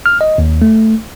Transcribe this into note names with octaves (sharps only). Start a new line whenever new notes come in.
F6
D#5
D#2
A3